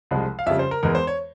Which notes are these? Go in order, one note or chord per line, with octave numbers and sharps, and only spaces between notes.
C2 C3 F3 G#3
F5
F2 C#3 G3 E5
C5
A#4
E2 E3 G#3 A#4
C5
C#5